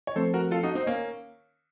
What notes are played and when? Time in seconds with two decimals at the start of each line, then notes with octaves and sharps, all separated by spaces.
0.07 C#5
0.16 F3 A3 C4 A4 C5
0.34 F#4 A#4
0.51 F4 A4
0.63 D#4 F#4
0.75 C4 D#4
0.86 A#3 C#4